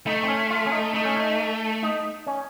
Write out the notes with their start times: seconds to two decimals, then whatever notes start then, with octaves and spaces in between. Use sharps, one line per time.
0.06 A3 D#4
0.23 C4
0.28 C#4
0.50 F4
0.66 C#4
0.72 D#4
0.94 A3 D#4
1.05 C#4
1.17 D#4
1.83 D#4
2.27 C#4